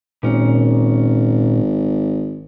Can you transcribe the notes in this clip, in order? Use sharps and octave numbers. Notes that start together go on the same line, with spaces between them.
G#1 A#2 C#4